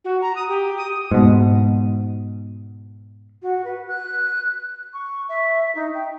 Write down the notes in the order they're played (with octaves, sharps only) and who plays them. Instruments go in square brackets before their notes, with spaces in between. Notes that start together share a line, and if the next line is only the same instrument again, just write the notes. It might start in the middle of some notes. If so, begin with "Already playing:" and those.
[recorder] F#4
A#5
D#6
G4
D#6
[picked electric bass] G#2 B2
[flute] F#4
B4
F#6
C#6
E5
D#4
G5